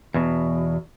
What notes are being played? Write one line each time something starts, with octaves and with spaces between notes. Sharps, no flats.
E2 B2